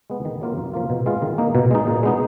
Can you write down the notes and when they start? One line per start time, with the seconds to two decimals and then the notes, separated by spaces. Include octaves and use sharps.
0.10 G#3 B3
0.25 D#3
0.41 F#3 A#3 F4
0.57 F#2
0.74 F3 A#3 F4
0.90 B2
1.06 G#3 B3 F4
1.22 D#3
1.38 A#3 D#4
1.55 B2
1.71 G#3 D#4
1.87 A#2
2.03 G#3 B3 D#4